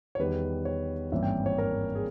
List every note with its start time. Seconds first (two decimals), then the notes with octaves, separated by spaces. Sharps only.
0.15 C#5
0.19 E2 D#3 G3 B4
0.65 C#5
1.12 G#1 G2 E3 A#3 C#4 E5
1.23 G5
1.46 C#5
1.58 A#4
1.95 G#4